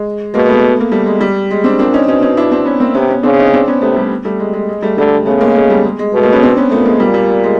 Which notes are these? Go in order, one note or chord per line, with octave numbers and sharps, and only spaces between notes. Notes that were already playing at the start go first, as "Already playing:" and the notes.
Already playing: G#3
B2 G#3 A#3
A3 B3
A#3
G3 A3
G#3
G3
G#3
C4 D4
A#2 C4 D4
C#4 D#4
B2 C#4 D#4
C#4 D#4
D4 E4
C4 D4
B3 C#4
A#3 C4
C3 B3 C#4
B3 C#4
C#3 C4 D4
C#4 D#4
C4 D4
B3 C#4
C3 A3 B3
G3 A3
G3 A3
G#3
G#3
G#3
G3 A3
D3 G3 A3
C#3 A3 B3
G#3 A#3
G#3 A#3
G3 A3
G#3
G#3
B2 A3
G#3 A#3
B3 C#4
C4 D4
B3 C#4
A#2 A3 B3
G#3 A#3
A#2 G3
G3
G#3